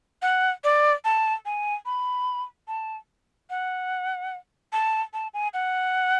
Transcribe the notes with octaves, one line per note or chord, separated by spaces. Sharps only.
F#5
D5
A5
G#5
B5
A5
F#5
A5
A5
G#5
F#5